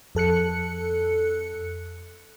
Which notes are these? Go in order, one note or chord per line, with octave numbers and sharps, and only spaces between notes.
F2 A4 F#6 C#7